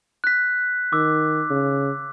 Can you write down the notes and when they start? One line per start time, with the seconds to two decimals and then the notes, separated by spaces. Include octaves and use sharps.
0.24 F#6 B6
0.93 D#3 D6 E6
1.50 C#3